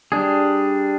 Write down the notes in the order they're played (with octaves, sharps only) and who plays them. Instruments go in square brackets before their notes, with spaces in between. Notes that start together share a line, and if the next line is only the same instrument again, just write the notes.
[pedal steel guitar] G3 D4 G#4